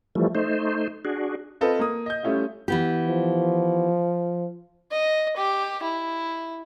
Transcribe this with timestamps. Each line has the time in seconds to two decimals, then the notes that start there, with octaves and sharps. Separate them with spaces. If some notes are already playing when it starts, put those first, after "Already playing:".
0.15 E3 F3 G3 A3
0.35 A3 D#4 C5
1.05 D4 F#4 G#4
1.61 C4 F4 A4 B4 D#5
1.79 A#3 D#6
2.06 D#5 G6
2.23 G3 A3 C#4 E4 F4
2.68 E3 B3 G4
3.08 F3
4.92 D#5
5.37 G4
5.83 E4